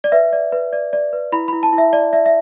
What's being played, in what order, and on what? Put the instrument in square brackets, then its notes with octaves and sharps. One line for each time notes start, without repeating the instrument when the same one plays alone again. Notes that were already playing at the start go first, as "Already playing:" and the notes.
[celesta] D5
B4 E5
D5
B4
D5
D5
B4
E4 B5
B5
E4
A5
E4
E5
D5
D5 E5
E5